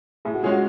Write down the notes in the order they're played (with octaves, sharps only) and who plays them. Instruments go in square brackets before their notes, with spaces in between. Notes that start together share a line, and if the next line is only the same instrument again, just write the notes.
[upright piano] A2 [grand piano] G#4
[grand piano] F#4
[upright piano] G#3 C#4 G#4 [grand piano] F4
[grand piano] F#4